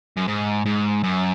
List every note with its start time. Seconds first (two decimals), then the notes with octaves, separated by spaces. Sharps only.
0.17 F#2
0.27 G#2
0.66 G#2
1.03 F#2